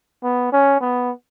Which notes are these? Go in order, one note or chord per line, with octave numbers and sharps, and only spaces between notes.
B3
C#4
B3